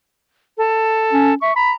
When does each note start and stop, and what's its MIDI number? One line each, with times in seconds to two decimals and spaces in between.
0.58 1.34 69
1.13 1.34 61
1.42 1.54 76
1.42 1.51 85
1.56 1.74 82
1.56 1.72 83